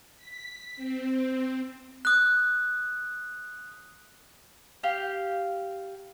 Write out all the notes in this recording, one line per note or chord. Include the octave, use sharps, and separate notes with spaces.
B6
C4
D#6 F#6
G4 F5